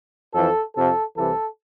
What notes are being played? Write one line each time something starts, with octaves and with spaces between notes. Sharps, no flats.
F2 E3 A4
F2 C3 F3 A4
C2 C3 E3 A4